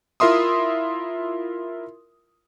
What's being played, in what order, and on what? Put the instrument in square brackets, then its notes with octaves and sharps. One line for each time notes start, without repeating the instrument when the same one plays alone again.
[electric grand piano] E4 F4 A#4 E5 C6 D#6